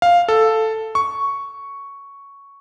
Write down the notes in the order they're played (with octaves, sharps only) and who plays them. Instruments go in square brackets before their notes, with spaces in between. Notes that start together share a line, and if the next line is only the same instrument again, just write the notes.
[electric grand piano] F5
A4
C#6